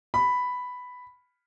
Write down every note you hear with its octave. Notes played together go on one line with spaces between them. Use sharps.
B5